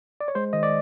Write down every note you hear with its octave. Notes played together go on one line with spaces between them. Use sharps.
D5
C#5
G#3 C5
D#3 D#5
D5